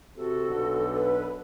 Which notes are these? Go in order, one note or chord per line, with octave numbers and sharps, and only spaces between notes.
C3 F#4 A4
B1 D3
B4